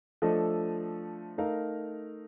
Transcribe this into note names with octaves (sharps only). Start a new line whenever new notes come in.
F3 A3 D4 A4 D#5
A3 D#4 A#4 F5